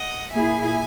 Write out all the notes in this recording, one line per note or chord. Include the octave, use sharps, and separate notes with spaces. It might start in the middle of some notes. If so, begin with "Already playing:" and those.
Already playing: D#5 F#5
A#2 A#3 E4 G#4 E5 G#5